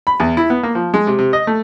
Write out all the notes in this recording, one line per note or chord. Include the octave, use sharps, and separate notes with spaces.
B5
E2
E4
B3
A#3
F3
G#3
C3
C3
D#5
A3